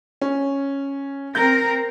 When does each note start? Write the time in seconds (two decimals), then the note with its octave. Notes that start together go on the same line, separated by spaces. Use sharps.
0.21 C#4
1.35 C4 A#4 G6